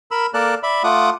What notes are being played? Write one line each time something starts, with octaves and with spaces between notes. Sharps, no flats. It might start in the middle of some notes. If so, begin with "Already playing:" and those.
A#4 B5 E6
A#3 A4 A#4 D5 A5 F#6
D5 E5 B5
A3 F4 F#5 D6 D#6